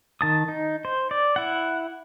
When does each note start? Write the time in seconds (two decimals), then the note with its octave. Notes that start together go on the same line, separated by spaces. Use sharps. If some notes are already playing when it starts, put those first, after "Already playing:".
0.21 D#3 A5 D#6
0.48 D#4
0.85 C5
1.11 D5
1.36 E4 F#5